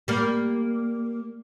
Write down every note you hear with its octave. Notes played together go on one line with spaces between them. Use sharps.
G3 A#3